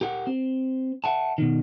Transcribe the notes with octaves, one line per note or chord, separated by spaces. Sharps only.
G4 A#4 F#5
C4
E5 F#5 A5
B2 D#3